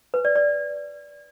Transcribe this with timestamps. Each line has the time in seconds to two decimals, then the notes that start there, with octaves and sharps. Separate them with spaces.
0.14 B4
0.25 D5
0.36 D5